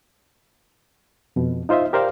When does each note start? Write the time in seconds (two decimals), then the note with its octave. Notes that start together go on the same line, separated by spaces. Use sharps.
1.36 F2 B2
1.69 D#4 F4 C5 D#5 E5
1.93 G4 A#4 C5 D5 F5 G5